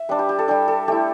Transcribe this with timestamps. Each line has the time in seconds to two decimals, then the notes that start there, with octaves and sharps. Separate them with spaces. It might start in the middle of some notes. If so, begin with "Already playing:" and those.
Already playing: E5
0.09 G3 D4 B4
0.19 G4
0.29 G4
0.39 A4
0.48 G3 D4 G4
0.68 A4
0.88 A3 E4 G4